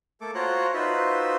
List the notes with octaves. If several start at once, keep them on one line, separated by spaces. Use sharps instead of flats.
A3 A#3 A4 D6
F4 F#4 C5 C#5 A#5 F#6
D#4 F4 F#4 B4 C5 E5